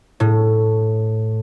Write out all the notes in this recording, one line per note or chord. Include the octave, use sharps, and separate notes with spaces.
A2